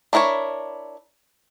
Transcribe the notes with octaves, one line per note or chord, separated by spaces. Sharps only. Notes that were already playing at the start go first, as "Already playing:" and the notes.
D4 E4 A#4 C5 C#5